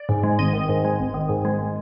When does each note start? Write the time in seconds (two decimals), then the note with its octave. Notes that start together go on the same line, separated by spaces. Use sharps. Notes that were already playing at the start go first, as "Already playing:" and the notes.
Already playing: D5
0.09 G#2
0.24 G#3
0.39 G#1 D#5
0.53 D#3
0.69 G#2
0.85 G#3
0.99 G#1
1.14 D#3
1.29 G#2
1.45 G#3